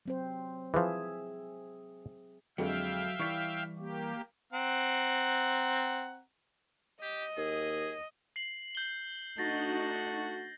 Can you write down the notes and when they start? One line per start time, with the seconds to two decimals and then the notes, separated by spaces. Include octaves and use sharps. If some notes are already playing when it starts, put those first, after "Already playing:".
0.06 F#3 C4 C5
0.74 E3 F3 G#4 E5
2.58 F2 D3 F#3 G#3 E5 F5 G5
3.20 E3 G3 E4 C#6 B6
3.78 A#3 G4
4.53 C4 F#5 A#5
7.02 G4 D#5
7.37 D#2 G#4
8.36 C7 F#7
8.75 G6 G7
9.38 A3 D4 D#4 F#4 A6 A#6